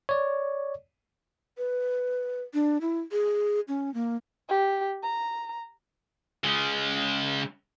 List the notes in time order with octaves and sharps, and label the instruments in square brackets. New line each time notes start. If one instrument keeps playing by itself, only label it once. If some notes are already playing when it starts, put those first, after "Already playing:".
[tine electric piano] C#5 D5
[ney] B4
D4
E4
G#4
C#4
A#3
[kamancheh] G4
A#5
[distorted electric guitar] C#3 G#3